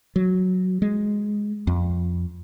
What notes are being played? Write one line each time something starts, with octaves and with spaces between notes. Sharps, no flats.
F#3
G#3
F2